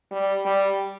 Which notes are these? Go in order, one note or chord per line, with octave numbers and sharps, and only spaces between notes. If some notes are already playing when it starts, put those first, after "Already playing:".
G3
G3